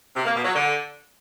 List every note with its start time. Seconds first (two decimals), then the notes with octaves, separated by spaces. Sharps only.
0.16 C3
0.25 A#3
0.35 B2
0.44 F#3
0.54 D3